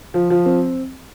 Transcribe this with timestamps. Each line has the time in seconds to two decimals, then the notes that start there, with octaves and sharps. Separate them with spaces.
0.14 F3
0.30 F3
0.46 C4